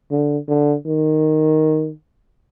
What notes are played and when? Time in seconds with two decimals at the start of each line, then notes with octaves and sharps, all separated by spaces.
0.11 D3
0.48 D3
0.86 D#3